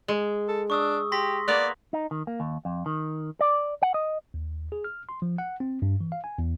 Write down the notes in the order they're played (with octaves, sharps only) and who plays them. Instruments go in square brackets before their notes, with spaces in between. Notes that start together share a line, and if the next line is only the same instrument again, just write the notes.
[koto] G#3
[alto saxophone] A4
[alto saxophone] D4 [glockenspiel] C#6 D#6 E6
[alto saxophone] G4 [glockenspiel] C6 A#6 B6
[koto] A#3 B3 [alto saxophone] D5 [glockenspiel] F#6
[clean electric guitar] D#4
D#3
A#3
D#2
F2
D#3
D5
F#5
D#5
[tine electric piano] D#2
G#4
F6
C6
F3
F#5
C4
G2
E3
F5
G#5
E2